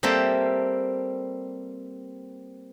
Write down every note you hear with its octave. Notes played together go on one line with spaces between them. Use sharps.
G3 A#3 C4 A4 E5